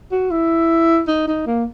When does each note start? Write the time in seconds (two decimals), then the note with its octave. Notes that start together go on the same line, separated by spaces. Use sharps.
0.12 F#4
0.31 E4
1.08 D#4
1.28 D#4
1.47 A#3